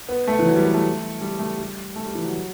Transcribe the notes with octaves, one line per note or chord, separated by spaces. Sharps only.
B3
A3
E3
F#3
G3
B3
A3
G3
A3
G3
A3
G3
E3
F#3